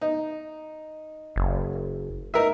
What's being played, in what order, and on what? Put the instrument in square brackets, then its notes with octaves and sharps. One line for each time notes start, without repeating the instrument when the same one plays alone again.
[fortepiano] D#4
[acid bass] F#1
[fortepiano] D#4 A#4 E5